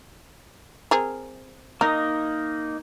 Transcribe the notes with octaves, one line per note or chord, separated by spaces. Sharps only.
C4 G#4 A#4
A#3 D#4 A#4 D#5